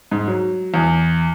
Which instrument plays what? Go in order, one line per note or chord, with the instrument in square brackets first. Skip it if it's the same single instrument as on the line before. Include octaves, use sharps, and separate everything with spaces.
[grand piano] G#2
F#3
E2